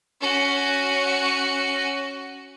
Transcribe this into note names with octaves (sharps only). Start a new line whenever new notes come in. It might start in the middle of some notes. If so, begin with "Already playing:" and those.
C#4 F#4